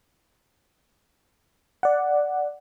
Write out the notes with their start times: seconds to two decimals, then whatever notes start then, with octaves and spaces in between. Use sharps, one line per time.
1.83 D5 F#5